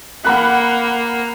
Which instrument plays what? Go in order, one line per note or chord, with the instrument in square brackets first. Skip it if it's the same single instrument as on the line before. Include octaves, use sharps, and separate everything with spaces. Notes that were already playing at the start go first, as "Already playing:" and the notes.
[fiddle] A#3 [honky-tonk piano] F#5 B5 F#6